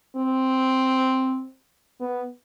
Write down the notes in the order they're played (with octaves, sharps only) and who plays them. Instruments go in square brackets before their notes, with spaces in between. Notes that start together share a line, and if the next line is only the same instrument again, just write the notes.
[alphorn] C4
B3